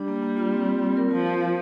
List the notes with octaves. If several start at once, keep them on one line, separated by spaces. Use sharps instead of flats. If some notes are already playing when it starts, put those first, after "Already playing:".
Already playing: G3 D4
A#3
A#3
F4
C4
C4
C4
A#4
F3 F4
F4
F5